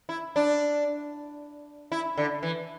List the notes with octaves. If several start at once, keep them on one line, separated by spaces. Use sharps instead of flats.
E4
D4
E4
D3
E3